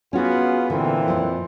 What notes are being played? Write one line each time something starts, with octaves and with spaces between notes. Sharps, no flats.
B3 C#4 F4 F#4 G#4
A#2 D3 E3 C4
F2 F3